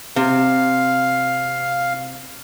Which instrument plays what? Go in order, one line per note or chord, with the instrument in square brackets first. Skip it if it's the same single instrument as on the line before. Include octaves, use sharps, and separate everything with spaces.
[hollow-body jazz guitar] C3 [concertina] F5